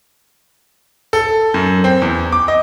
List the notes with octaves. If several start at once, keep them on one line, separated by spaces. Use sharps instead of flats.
A4
F#2
C4
E2
D6
D#5